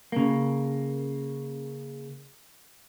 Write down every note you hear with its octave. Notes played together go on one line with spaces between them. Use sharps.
C#3 A#3